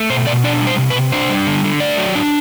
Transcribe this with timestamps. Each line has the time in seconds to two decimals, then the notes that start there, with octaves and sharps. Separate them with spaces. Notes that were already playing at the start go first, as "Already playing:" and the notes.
Already playing: A3
0.10 B2 C5
0.27 B2 D5
0.44 D4 D5
0.62 G3
0.67 C5
0.78 C3
0.90 B4
0.96 C3
1.12 D4 C5
1.30 G3
1.47 D3
1.64 D3
1.80 A3 D5
1.98 F#3
2.15 D4